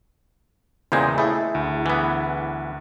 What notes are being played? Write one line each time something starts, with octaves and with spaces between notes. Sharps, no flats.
E2 A#2 C#3 G#3 C5 G5 G#5
A3 E4 G#4
D2
E3 B3